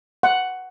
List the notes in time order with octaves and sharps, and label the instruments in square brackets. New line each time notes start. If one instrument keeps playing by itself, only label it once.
[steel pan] F#5